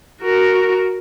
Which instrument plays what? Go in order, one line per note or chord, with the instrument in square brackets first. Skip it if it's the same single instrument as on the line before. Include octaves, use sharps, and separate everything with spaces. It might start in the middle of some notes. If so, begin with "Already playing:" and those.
[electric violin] F#4 A#4